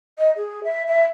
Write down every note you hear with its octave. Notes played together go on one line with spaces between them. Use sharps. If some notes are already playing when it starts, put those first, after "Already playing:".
D#5
G#4
E5
E5